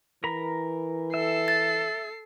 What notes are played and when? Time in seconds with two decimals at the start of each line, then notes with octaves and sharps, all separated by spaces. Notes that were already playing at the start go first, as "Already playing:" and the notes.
0.24 E3 A#4 A#5 B5
1.14 A4 E5 C7
1.48 A6